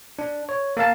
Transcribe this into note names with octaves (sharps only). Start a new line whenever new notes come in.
D4
C#5
A#3 A#4 F5 A5